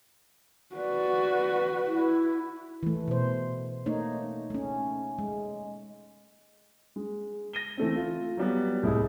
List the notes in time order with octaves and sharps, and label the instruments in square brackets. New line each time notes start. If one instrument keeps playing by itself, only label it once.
[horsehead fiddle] F#4 B4 [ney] D5
[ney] E4
[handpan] E3 A3
B2 C5
A3 A#3 D#4 C#5
A3 C#4
G#3
[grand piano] G#3
A#6 D#7 G7
E3 A3 C4
F4
F#3 G3 B3
C2 A2 E4 G#4 D#5